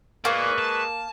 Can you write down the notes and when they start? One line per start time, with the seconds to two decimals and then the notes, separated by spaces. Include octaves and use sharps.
0.25 G#3 A#3 B4 D5 G#5 C#6
0.59 A5